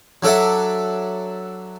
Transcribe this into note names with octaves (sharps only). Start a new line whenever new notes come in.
F#3 D4 A4 E5 F#5